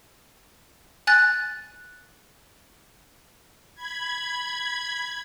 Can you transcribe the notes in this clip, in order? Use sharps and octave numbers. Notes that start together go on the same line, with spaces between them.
G#5 F#6 A6
B5 G#6